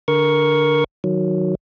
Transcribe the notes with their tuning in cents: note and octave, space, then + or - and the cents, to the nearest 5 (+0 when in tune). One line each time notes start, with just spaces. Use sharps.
D3 +0 A#4 +15 C#6 +0
D#3 +0 F#3 +0